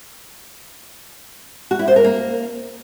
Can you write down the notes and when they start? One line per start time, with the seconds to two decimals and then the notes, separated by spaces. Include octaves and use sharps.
1.71 F#4
1.79 E4
1.88 C5
1.96 A#4
2.04 A#3